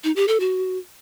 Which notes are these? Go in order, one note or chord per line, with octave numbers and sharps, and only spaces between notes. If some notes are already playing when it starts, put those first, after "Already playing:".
D#4
G4
A4
F#4